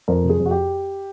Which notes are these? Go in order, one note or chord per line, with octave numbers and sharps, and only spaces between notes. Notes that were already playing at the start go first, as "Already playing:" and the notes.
F2 A#4
C3
G#4
F2
F#4
G4